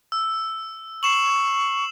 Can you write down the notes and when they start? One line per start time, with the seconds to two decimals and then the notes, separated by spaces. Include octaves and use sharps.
0.12 E6
1.03 C#6 C7 E7 F#7